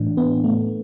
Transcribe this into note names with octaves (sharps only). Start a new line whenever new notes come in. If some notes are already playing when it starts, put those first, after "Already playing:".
Already playing: A2 E3 D4
B3
A3